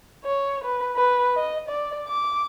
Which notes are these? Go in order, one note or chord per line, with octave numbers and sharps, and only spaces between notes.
C#5
B4
B4
D#5
D5
D6